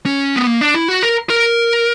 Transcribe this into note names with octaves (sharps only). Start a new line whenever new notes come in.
C#4
B3
A#3
D4
E4
F#4
A#4
A#4